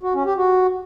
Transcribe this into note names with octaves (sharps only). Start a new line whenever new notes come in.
F#4
C#4
G4
F#4